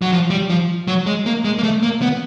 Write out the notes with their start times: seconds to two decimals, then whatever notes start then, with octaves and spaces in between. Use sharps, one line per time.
0.02 F#3
0.12 F3
0.30 G3
0.50 F3
0.88 F#3
1.06 G#3
1.26 A#3
1.45 G#3
1.59 A#3
1.63 A3
1.83 A#3
2.02 B3